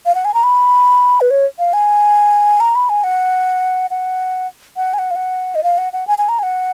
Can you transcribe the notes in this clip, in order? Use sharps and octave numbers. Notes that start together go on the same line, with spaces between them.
F5
F#5
G#5
A#5
B5
B4
C#5
F5
G#5
A#5
B5
G#5
F#5
F#5
F#5
G#5
F#5
F5
F#5
D#5
F5
F#5
F#5
G#5
G#5
A#5
G#5
F#5